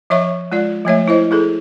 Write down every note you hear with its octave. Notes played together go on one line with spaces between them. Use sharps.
F3 C#5 E5 C#6
G#3 F4 D5
F3 A3 C#5 E5
E4 C5 D#5
E4 G#4 A4